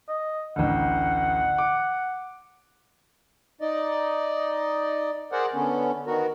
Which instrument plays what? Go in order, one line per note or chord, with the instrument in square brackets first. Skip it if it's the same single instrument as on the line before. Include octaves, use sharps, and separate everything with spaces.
[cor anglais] D#5
[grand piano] A1 D2 [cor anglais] F#5
[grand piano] D6
[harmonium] D#4 D5 D#5
G#4 A#4 C5 D5 F#5
D3 B3 C#4
D#3 B3 F#4 A#4